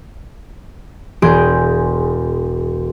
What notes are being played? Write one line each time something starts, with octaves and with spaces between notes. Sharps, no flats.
E1 G#4 C6 G6 D7